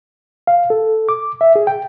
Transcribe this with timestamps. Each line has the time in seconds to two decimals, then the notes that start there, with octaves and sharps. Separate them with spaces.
0.47 F5
0.70 A4
1.09 D6
1.41 E5
1.56 G#4
1.67 G5